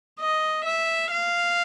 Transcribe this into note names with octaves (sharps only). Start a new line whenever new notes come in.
D#5
E5
F5